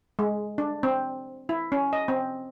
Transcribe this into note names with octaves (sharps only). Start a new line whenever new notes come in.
G#3
D4
C4
E4
C#4
D#5
C4